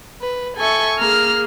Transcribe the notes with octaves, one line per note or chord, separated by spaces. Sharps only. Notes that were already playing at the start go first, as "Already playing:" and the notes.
B4
A4 E5 G#5 C#6
A#3 G#4 A#5 F6